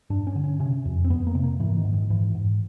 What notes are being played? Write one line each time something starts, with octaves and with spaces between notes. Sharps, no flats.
G2 D4
C#4
D3
C#4
C3 C#4
F2
C4
F2 B3
A#3
C3
A#3
G#2 E3
D#3
G#2
D#3
G#2 E3
G#2